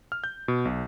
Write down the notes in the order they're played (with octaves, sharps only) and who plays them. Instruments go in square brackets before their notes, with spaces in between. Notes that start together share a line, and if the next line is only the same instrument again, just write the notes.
[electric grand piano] F6
G6
B2
B1